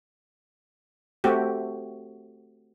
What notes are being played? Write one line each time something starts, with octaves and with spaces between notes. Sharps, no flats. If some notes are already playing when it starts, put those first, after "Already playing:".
A3 C4 F#4 G4